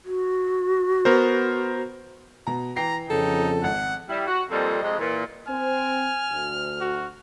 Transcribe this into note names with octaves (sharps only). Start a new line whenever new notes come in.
F#4
B3 A#4 C5
B2 A#5
E3 G5 A#5 C7
F2 C#3 D#4 A4
G#1 F#5
G3 E4
F#4
F2 A#2 G3 C4 A4 D#5
F2 C3 G#3 D#5
A#2 E3
C4 G#5 F6
D2
F#4